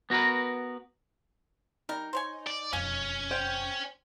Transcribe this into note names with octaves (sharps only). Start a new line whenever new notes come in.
B3 F#4 G4 A#4 B4
G3 D#4 A#4
C5 C#5 G#5
D5
E1 F2 C#4 F5 G#5
C5 G5